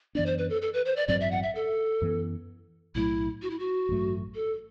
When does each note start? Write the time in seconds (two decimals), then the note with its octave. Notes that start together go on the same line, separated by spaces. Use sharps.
0.15 F#2 E3 B3 D4 D5
0.26 C5
0.38 B4
0.50 A4
0.62 A4
0.74 B4
0.85 C5
0.96 D5
1.08 A1 G2 F#3 C4 D5
1.21 E5
1.31 F#5
1.43 E5
1.55 A4
2.02 F#2 E3 B3
2.95 B1 A2 F#3 A3 E4
3.42 F#4
3.50 E4
3.59 F#4
3.89 A1 G2 F#3 A3
4.35 A4